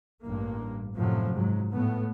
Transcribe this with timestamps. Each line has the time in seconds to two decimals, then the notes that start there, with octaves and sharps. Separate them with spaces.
0.22 A1 G2 A#3
0.95 F#2 A2 C3 F3 F#3
1.34 G#2 F#3
1.72 A2 A3 B3